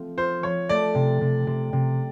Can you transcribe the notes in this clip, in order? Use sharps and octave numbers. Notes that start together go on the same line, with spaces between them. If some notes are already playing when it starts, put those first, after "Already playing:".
Already playing: F3 A3 C4
F4 C5
F3 C#5
A3 D5
C3
C3
C3
C3